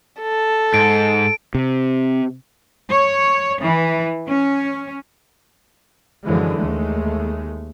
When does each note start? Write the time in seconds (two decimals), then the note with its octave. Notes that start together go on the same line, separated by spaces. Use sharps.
0.22 A4
0.74 G#2 D7
1.55 C3
2.91 C#5
3.63 E3
4.27 C#4
6.24 F#2 D3 E3 F3 G#3
6.57 D#2 G#3 A3